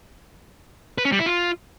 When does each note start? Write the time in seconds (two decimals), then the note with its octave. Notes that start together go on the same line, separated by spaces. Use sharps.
0.98 B4
1.05 C#4
1.12 G3
1.19 E4
1.26 F4